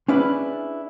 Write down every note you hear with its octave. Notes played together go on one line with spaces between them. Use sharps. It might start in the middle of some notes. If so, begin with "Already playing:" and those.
C#4 D4 E4 G#4 B4